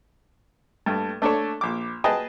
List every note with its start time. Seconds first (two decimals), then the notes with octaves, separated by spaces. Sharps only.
0.86 G2 A3
1.22 A3 D4 A4 C#5
1.61 A#1 D6
2.04 G#4 B4 D#5 G5 A5